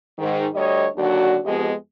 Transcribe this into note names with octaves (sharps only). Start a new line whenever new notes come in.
G#2 D#3
D2 G3 C#5 D#5
D#2 D3 F#3 D4 F#4
F2 F3 G#3 B3 G4 D#5